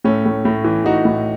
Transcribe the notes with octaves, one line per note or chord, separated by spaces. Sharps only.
A2 A3 C#4
A2
A2
E3
E3 D#4 F#4
A2